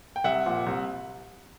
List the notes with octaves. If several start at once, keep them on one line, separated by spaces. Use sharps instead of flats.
G5
C2 E5 F#5
A#2 F3
C2